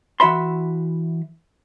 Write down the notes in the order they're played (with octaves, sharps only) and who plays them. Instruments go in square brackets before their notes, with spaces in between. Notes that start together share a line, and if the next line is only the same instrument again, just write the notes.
[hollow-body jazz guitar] E3 F#4 E5 B5 C6